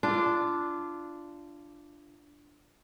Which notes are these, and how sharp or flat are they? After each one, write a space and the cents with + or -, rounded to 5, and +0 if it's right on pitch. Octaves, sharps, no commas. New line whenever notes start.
D4 +0 F4 -25